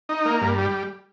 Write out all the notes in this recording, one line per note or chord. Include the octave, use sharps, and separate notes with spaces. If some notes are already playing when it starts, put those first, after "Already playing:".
D#4
A#3
G2
G3